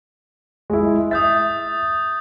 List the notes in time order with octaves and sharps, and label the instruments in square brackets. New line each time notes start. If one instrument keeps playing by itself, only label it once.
[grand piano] G#3 E4
[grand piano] E5 [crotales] D#6 G6 A6